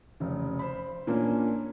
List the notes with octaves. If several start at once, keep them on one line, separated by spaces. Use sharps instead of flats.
F1 C#3
C5 B5
A#2 A#3 C#4 D4